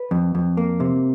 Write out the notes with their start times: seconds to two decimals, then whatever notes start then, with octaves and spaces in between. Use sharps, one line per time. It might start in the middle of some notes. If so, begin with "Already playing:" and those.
Already playing: B4
0.11 F2
0.35 F2
0.57 A#3
0.80 C3